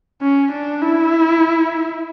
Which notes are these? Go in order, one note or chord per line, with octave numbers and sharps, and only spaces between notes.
C#4
D4
E4